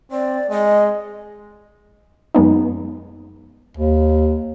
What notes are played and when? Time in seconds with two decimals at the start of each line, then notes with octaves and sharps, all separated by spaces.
0.11 C4 D5
0.51 G#3 D#5
2.35 F#2 G#3 B3 D#4
3.77 D#2